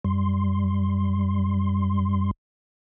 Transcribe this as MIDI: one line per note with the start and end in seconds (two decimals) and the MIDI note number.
0.04 2.31 42
0.04 2.31 55
0.04 2.31 84